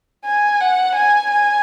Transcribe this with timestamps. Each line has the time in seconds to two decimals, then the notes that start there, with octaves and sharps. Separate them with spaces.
0.26 G#5
0.60 F#5
0.95 G#5
1.30 G#5